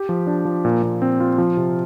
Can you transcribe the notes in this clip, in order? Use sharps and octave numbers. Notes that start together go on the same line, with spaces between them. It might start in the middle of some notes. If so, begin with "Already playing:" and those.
Already playing: G4
F3
D4
F3
A#2
A#2
C4
F4
F3
C3